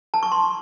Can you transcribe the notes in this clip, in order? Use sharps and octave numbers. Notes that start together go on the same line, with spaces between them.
A5
C#6
C6